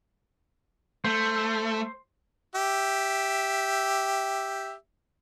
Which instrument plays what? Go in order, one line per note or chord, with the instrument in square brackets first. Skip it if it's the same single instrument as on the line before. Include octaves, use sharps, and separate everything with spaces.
[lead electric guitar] A3 [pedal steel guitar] C5
[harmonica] G4 E5